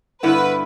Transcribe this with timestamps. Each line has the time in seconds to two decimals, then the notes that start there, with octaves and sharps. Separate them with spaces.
0.23 G2 D3 B3 E4 B4